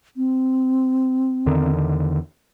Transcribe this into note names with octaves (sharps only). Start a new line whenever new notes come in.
C4
E2 D3 D#3